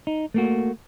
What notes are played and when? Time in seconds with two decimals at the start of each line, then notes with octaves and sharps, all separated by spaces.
0.07 D#4
0.34 A3 A#3 F#4